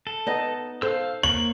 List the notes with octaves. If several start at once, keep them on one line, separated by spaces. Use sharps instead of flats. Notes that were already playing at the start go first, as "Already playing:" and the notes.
A4
B3 D#4 D#5
A4 C5 F5 E6
A#3 C#5 F#7